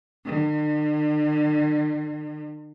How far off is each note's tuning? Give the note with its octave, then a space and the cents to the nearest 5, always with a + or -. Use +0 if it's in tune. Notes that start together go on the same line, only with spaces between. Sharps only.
D3 +45